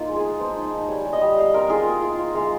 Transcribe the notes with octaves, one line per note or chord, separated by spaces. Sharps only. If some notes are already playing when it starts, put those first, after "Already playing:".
Already playing: A#3 D#4 F4
G#3
G#4
G#3
F3 C5
D#4
D#4
G3 C#5
G3
D#5
G3
G3 F5
C4 A#4
F4 G#4
A#3
F4
F4
G#3 F5